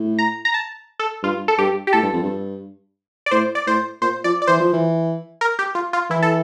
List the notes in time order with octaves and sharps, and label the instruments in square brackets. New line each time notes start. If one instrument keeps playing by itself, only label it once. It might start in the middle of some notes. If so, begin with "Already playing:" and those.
Already playing: [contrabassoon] A2
[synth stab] A#5
A#5
A5
A4
[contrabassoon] G2 [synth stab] F4
[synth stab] A4
[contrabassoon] G2 [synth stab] G4
[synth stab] G4
[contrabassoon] A2 [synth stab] A4
[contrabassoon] G2
F2
G2
[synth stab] D5
[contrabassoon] A2 [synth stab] C5
[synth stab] D5
[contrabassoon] A2 [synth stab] C5
[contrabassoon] A#2 [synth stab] C5
[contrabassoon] F3 [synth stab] D5
[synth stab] D5
[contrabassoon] E3 [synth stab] C5
[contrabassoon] F3
E3
[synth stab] A#4
G4
F4
F4
[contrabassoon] E3 [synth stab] E4
[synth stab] A4